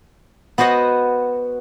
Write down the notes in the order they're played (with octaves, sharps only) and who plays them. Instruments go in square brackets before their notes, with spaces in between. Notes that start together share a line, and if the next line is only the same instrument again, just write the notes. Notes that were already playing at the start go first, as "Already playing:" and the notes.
[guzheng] B3 F#4 C5 D#5 F#5